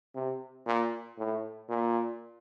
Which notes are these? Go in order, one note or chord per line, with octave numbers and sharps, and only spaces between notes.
C3
A#2
A2
A#2